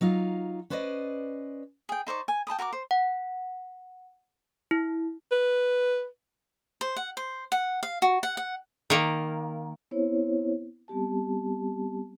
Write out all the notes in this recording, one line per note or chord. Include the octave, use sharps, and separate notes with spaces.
F#3 D#4 F4 F5
C#4 B4 C5 D5 D#5
G#4 G5
D#4 C5 D5 C#6
G#5
G5 A5 B5 D#6
F#4 A#4 A#5 D6
C5
F#5
E4
B4
C5
F#5
C5
F#5
F5
F#4
F#5
F#5
D#3 A#3
B3 C4 E4 C5 C#5
G3 B3 C4 G4 A5